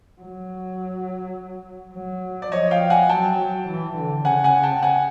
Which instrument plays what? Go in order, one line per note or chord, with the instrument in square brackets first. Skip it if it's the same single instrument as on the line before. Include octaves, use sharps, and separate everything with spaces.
[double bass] F#3
F#3
[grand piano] D5
[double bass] F3 [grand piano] C#5 D#5
[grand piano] F5 G5
F#5 G#5
[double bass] F#3 [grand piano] G5 A5
[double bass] F#3
E3
D3
[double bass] C#3 [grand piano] F#5 G#5
[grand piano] F#5 G#5
G5 A5
F#5 G#5